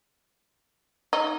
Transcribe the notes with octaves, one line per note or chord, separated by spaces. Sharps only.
D#4